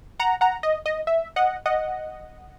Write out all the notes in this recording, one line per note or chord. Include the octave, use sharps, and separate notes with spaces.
F#5 A#5
F#5 A#5
D#5
D#5
E5
D#5 F#5
D#5 F#5